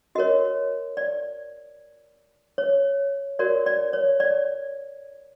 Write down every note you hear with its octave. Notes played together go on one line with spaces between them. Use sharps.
F#4 A#4 C#5 D#5
D5
C#5
F#4 A#4 C#5 D5
D5
C#5
D5